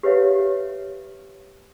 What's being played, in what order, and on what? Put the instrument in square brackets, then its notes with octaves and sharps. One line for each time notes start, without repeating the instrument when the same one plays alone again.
[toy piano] G4 B4 C#5 E5 F5